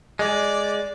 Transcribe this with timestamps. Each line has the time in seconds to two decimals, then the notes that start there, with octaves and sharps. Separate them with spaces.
0.19 G#3 D5